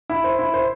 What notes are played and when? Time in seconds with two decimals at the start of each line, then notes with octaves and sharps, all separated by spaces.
0.09 E4
0.24 C5
0.39 E4
0.54 C5